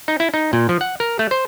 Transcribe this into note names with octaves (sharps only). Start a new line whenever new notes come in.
D#4
E4
D#4
A#2
F3
F#5
A#4
A3
C5